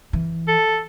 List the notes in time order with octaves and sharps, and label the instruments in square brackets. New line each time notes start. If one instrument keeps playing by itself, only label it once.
[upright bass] E3
[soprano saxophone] A4